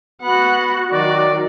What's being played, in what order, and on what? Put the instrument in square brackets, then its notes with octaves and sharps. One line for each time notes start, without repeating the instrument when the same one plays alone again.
[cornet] B3 [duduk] F#4 [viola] F#5 B5
[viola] D#3 F#3 [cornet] D5